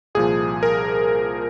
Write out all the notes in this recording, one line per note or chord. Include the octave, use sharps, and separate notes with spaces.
C2 A#2 F3 G#4
A#4